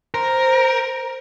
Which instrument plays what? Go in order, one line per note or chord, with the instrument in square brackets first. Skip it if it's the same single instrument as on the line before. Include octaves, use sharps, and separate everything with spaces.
[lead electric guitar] A#4 [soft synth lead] C5